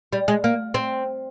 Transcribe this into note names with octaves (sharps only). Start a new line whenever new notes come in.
G3
G#3
A#3
C4